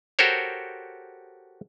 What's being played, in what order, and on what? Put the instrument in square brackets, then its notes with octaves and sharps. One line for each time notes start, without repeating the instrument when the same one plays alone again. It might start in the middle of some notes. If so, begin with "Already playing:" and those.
[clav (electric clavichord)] F#4 G4 A4 A#4 C5 C#5